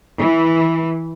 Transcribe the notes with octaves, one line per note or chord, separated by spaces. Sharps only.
E3